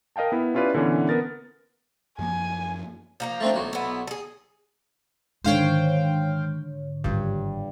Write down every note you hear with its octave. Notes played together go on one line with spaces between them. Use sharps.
A#4 D#5 F5 G5 A5
B3 E4
C#4 E4 F4 G4 B4 D5
A#2 D3 E3 B3 C#4
B3 A#4 A6
F#2 F3 A#3 G#5
F3 A#3 F4
A3 C4 D4
B1 F#3
B3 E4
G#4 A4
G#2 D3 D#3 G#3 C5 C#5 F5 G5
G#1 G2 F4